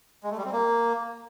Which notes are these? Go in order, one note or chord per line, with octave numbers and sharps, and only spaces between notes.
G#3
A3
G3
C4
A#3